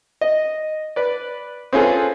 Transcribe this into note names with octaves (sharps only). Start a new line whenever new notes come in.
D#5
B4 D5
C4 C#4 F4 G#4 A4 B4